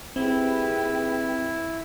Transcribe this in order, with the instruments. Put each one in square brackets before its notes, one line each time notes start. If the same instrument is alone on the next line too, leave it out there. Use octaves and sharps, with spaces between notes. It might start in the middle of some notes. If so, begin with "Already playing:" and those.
[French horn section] D#2 G#4 [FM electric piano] C4 [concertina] E4 [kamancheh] G4 B4